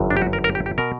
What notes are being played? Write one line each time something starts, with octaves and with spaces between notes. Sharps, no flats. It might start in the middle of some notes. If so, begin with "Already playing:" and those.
Already playing: G1 F#2 E3
D4
G4
F#4
A#4
A#4
G4
G4
B2 A#4